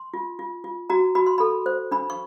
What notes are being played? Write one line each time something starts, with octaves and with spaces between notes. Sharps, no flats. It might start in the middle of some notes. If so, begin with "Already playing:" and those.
Already playing: C6
F4
F4
F4
F#4 A#5
F#4 B5
C6
A4 B5
C5
D4 B5
C#6